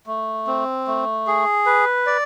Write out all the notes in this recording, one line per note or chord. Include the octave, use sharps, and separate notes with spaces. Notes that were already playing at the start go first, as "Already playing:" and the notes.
A3
C4
A3
G#4
B4
D5